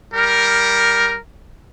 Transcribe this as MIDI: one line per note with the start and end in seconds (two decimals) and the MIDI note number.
0.14 1.16 55
0.14 1.16 70